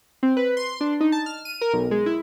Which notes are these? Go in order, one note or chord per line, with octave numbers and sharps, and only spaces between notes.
C4
B4
C6
D4
D#4
A5
F6
D#7
A#4
B1
G#3
E4